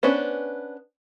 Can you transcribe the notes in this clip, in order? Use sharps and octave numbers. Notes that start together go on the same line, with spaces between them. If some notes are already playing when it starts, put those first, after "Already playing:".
B3 C#4 D4 B4 C5